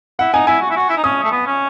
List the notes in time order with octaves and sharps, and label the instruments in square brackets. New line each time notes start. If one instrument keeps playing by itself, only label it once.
[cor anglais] E4 [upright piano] F#5
[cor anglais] D#4 [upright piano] G#5
[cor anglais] E4 [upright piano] G#5
[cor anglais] F#4
E4
F#4
E4
D#4
[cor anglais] C#4 [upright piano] D#6
[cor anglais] A3
B3
C#4